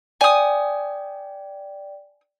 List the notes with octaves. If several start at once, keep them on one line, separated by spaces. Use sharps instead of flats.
D5 G5 G#5 D#6